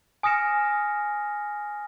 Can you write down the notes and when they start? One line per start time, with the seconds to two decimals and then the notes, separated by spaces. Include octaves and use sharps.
0.23 G#5 D#6 F6 A#6 C#7 E7